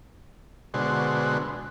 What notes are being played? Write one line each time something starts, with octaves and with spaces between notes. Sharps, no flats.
B2 D3 G#3 F#4 C5